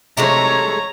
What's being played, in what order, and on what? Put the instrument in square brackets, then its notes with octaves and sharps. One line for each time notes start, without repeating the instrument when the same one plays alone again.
[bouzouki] C3 G#3 A3 [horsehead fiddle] C#5 A#5